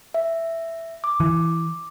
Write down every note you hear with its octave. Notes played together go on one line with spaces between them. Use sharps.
E5
D6
E3